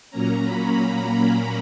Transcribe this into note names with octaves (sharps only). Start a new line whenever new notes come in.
A#2 F#3 A#3 C#4 A#5
B5
A#5